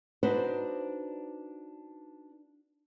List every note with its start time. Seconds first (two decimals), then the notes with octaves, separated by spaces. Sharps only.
0.23 D4 D#4 F#4 B4 C5 D5